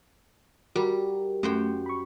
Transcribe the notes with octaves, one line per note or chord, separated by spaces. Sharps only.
G3 F#4 A#4
F#2 A3 C5 G5
B5 C#6